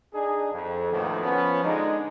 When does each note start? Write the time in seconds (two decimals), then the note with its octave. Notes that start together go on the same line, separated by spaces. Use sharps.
0.13 D4 D#4 G#4
0.52 F2
0.91 D2 A2 D#3 F3 A#3 B3
1.23 F3 B3 C#4
1.64 D3 G#3 D4 D#4